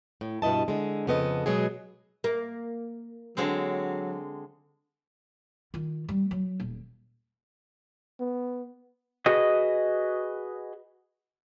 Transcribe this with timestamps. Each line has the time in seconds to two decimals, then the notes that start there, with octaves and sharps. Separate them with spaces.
0.21 A2
0.42 G2 B2 E4 D#5 A5
0.68 D3 G#3
1.07 F2 C#3 B3 A4 D#5
1.46 B2 F#3 G#3 G#4
2.24 A#3
3.37 D3 F#3 G#3 C4
5.74 D#3 F4
6.09 G3
6.31 F#3
6.60 D#1
8.20 B3
9.26 F#4 G#4 B4 D#5